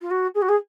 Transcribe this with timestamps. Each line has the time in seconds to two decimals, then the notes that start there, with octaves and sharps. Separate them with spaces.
0.01 F4
0.10 F#4
0.35 G#4
0.42 F#4
0.48 G#4